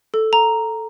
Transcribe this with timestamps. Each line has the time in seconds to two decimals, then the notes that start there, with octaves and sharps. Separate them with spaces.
0.14 A4
0.33 A#5